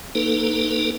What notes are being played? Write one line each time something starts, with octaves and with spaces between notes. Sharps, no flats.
A#3 D#4 A4 B4